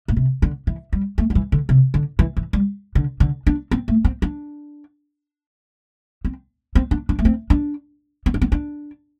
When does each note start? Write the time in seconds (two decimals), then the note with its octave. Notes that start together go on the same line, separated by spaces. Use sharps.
0.08 A2
0.17 C3
0.42 D3
0.67 E3
0.93 G3
1.18 A3
1.30 G3
1.35 E3
1.52 D3
1.69 C3
1.94 D3
2.19 E3
2.37 E3
2.53 G3
2.95 D3
3.20 D3
3.47 D4
3.71 C4
3.88 A3
4.04 C4
4.22 D4
6.25 C4
6.75 C4
6.91 D4
7.09 D4
7.19 A3
7.25 C4
7.50 D4
8.26 C4
8.34 D4
8.42 C4
8.52 D4